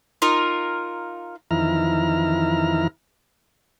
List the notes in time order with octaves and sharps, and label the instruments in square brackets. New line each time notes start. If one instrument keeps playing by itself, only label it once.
[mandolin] D#4 F4 A#4
[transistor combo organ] F2 D#3 E3 E4 A#5 F6